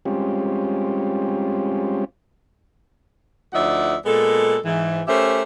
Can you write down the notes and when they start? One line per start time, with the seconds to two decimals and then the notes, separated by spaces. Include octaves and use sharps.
0.05 G3 G#3 C4 C#4 F4 G4
3.53 D2 F3 D#4 D5 E5 F#5
4.05 A#2 G#3 B3 A4
4.64 G#2 E3
5.07 A3 C#4 G4 A#4 C5 E5